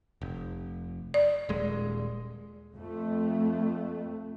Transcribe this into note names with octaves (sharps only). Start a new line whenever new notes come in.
F1
D5
D#1 G#3
F2 A3